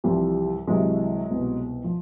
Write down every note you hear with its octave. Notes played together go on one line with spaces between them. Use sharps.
C2 C3 E3 F3 G3
C2 C3 E3 F#3 G#3
C2 B2
F3